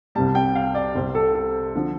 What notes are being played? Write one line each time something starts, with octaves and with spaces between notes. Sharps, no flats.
C2 C3 G3 A5
G5
F5
D5
C2 C3 G3 C5
A4
A4
D3 F3